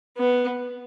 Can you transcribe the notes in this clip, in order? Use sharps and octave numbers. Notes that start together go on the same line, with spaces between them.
B3